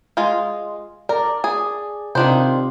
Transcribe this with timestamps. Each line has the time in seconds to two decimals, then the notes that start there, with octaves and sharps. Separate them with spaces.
0.17 G#3 F4
1.09 A#4 D5
1.44 G#4
2.15 C3 D#3 D4 F4 C5